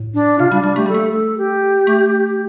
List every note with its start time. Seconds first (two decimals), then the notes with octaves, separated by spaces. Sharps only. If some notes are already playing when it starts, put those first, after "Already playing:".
Already playing: A2
0.14 D4
0.39 C3 F4
0.51 G3 D4
0.64 G3 D4
0.76 A3 G4
0.86 G3 A4
0.94 A3
1.13 A4
1.38 G4
1.87 A3